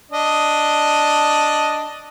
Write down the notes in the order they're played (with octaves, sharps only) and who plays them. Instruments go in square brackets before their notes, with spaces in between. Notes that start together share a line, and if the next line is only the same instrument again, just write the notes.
[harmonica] D4 D#5